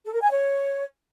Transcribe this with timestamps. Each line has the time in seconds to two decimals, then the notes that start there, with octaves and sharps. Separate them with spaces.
0.04 A4
0.13 A#4
0.22 G#5
0.30 C#5